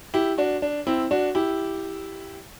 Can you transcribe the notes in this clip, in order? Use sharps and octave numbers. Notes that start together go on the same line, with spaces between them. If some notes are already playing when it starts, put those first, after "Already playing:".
E4 G4
D4 F#4
D4
C4 E4
D4 F#4
E4 G4